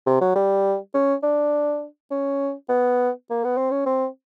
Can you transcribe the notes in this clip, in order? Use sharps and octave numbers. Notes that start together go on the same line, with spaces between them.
C3
F#3
G3
C#4
D4
C#4
B3
A#3
B3
C4
C#4
C4